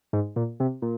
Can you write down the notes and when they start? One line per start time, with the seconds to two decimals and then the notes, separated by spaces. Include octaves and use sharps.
0.13 G#2
0.36 A#2
0.60 C3
0.82 A#2